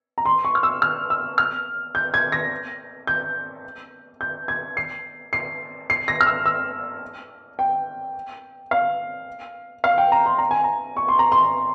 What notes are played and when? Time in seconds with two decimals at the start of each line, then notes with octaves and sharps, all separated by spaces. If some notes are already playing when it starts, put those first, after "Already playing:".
0.18 A#5
0.25 C6
0.45 C#6
0.55 F6
0.63 E6
0.82 F6
1.10 E6
1.38 F6
1.95 G6
2.14 G#6
2.32 A#6
3.07 G6
4.21 G6
4.48 G#6
4.77 C7
5.33 C7
5.90 C7
6.08 A#6
6.21 F6
6.26 E6
6.46 E6
7.59 G5
8.71 F5
9.84 F5
9.98 G5
10.12 A#5
10.26 C6
10.38 A#5
10.51 G#5
10.64 A#5
10.97 C#6
11.08 C6
11.19 A#5
11.32 C6